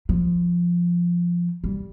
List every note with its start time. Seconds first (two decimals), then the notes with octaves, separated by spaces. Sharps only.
0.09 F3
1.64 G3